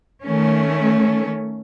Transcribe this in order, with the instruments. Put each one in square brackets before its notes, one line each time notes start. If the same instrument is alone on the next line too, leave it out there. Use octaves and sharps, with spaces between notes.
[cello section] D#3 A3 C#4